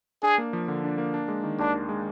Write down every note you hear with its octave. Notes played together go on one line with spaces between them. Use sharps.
D4 G#4
A#3
F3
D3
D4
A#3
D4
G#3
D#3
D#2 D4
D4
G#3